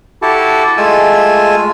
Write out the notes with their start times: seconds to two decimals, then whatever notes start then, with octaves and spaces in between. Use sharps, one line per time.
0.22 E4 F#4 G4 A4 A5
0.77 G#3 A3 F4 G#5 E6